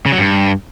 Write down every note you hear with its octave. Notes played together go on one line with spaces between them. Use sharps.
C#3
F#3
G2